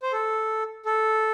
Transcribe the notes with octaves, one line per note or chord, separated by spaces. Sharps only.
C5
A4
A4